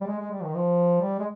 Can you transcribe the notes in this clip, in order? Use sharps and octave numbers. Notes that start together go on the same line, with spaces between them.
G3
G#3
G#3
G3
D#3
F3
G3
G#3